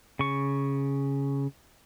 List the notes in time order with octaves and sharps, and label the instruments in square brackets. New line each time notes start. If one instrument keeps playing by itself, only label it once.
[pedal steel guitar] C#3 C#6